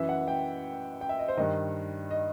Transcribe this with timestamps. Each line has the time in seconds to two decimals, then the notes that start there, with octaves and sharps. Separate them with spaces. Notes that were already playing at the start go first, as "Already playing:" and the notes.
Already playing: F#2 E3 E5
0.09 F#5
0.28 G5
1.01 G5
1.09 E5
1.19 D#5
1.28 C5
1.37 G2 D#3 D#5
2.11 D#5